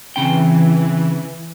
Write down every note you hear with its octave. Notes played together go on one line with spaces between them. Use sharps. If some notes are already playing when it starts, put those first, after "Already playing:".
C#3 E3 C4 G5